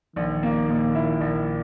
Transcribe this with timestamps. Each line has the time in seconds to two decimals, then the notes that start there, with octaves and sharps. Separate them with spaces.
0.16 A#1 D#3
0.43 A#3
0.68 A#2
0.95 E4
1.21 A#1